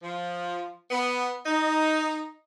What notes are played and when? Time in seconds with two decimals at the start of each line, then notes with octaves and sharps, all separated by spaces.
0.02 F3
0.90 B3
1.46 D#4